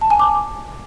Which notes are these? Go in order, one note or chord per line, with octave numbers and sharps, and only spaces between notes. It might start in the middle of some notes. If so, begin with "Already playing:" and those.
A5
G#5
D6